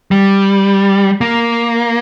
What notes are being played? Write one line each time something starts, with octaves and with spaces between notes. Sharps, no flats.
G3
A#3